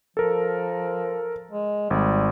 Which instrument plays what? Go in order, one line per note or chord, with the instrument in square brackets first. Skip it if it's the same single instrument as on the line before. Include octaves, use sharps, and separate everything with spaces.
[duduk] F3 [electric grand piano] A4 A#4
[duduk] G#3
[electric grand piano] G#1 [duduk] G3